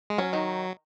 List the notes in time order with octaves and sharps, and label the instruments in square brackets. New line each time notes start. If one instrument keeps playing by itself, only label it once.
[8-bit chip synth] G#3
[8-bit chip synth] F#3 [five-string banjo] C#4
[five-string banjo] D#3 D#4